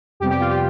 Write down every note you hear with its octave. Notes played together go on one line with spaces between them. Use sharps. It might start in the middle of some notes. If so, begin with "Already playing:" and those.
F2 C3 G3 B3 G4
G4
F4
G4